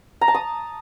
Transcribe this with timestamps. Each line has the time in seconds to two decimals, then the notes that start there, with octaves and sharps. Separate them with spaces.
0.21 A#5
0.28 A5
0.34 D#6